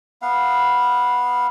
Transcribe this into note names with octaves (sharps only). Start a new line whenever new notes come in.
B3 F5 F#5